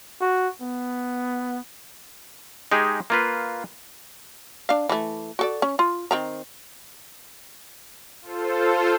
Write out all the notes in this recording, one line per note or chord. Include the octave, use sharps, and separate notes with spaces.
F#4
B3
G#3 D#4 G4 G#4
A#3 F4 B4
D4 F5
E3 A3
F#4 A4 D5
C#4
F4
D#3 C4 A#5
F4 A4 C5